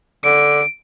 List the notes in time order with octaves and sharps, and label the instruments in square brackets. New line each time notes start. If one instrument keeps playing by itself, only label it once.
[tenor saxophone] D3 [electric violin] D7